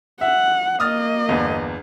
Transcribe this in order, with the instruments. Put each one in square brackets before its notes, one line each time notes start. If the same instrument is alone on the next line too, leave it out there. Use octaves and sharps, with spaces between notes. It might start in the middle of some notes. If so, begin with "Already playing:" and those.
[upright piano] E5 [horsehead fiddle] F#5
[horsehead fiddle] A#3 D#5 [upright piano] D#6 F6 A6
[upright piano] G1 E2